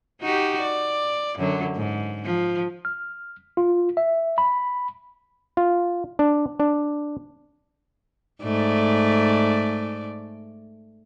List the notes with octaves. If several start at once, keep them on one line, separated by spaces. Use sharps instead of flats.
D#4 F#4 G4
D5
F#2 D3 F#3
G#2
F3
F6
F4
E5
B5
F4
D4
D4
G#2 A3 D5